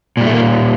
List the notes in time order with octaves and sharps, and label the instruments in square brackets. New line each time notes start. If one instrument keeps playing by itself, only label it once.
[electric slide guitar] A#2 G3
A3
A#3